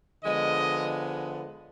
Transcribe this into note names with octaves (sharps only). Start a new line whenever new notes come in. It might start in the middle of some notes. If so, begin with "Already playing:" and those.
D3 F3 G#3 B3 D#5